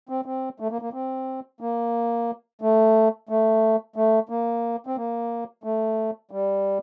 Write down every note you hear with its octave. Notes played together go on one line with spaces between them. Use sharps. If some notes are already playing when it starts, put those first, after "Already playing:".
C4
C4
A3
A#3
A#3
C4
A#3
A3
A3
A3
A#3
C4
A#3
A3
G3